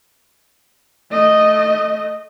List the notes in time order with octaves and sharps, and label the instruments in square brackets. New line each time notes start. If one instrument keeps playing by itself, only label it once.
[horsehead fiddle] A3 D#5